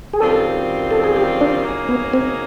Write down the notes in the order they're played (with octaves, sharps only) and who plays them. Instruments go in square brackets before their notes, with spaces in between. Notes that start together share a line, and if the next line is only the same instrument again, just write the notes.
[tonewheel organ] G#4
[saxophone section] F#2 D#3 G3 C4 F4 [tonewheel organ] A4
[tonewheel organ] A4
G#4
G4
D4
[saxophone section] C#3 F#3 A#3 D#4 G#4
[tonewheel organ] B3
C4